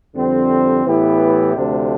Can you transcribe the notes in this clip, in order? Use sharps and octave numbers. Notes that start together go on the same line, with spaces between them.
F2 D3 G3 C4
A2 E3 B3 E4 G4
D2 C3 F3 A3 D4